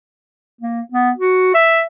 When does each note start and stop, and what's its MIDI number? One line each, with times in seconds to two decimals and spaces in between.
0.61 0.81 58
0.92 1.11 59
1.17 1.54 66
1.54 1.82 76